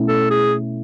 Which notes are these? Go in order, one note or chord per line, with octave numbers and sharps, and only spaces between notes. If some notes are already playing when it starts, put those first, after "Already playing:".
Already playing: B2 A3 C#4 E4
A4
G#4